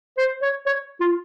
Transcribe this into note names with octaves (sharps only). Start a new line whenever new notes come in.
C5
C#5
C#5
F4